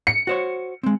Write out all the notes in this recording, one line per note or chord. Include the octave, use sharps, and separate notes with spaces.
C#7
F#4 C5 C#5
G#3 C4